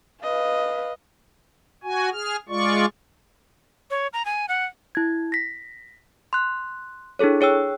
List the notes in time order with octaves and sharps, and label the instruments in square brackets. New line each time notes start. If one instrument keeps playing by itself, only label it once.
[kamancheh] B4 F5 [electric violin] D#5
[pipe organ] F#4 G#5
G#4 F6
G#3 F4 D5 C#6
[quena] C#5
A#5
G#5
F#5
[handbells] E4 G#6
A#6 B6
C6 F#6
D4 E4 G#4 A4 C#5
G#4 C#5 G5 E6